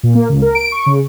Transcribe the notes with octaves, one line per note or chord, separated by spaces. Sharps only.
A#2
A#3
C#2
A#4
D7
C#6
C#3